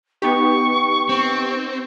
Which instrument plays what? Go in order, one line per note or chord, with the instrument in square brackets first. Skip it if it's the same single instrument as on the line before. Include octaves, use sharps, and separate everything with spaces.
[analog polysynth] B3 D#4 G4 [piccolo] C#6
[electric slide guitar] C4